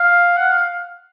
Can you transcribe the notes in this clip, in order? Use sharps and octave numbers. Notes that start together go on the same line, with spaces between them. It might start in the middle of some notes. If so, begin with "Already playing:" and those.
Already playing: F5
F#5
F5